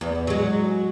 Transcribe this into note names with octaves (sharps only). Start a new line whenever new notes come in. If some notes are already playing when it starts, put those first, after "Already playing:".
E2
F#3 G#3